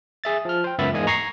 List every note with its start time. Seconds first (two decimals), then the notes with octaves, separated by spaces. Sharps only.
0.24 G#4 E5 A6
0.45 F3 F6
0.64 C5 G5
0.79 C#2 F#2 B3 E5 B5 A6
0.92 E2 G#2 A#3 D#5 G#5 D#6
1.07 A#5 C#6 G#6 A#6 C7